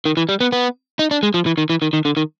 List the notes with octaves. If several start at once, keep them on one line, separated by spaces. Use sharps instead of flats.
D#3
E3
G3
B3
B3
D#4
D4
G#3
F3
E3
D#3
E3
D#3
D#3
D3
D#3